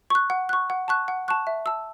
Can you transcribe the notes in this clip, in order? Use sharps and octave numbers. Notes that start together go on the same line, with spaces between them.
C#6 F#6
F#5
C#6 F#6
F#5
A5 C#6 F#6
F#5
A5 C#6 F#6
E5
A5 E6